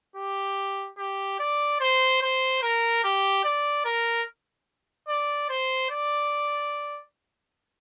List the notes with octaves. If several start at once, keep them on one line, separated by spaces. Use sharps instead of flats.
G4
G4
D5
C5
C5
A#4
G4
D5
A#4
D5
C5
D5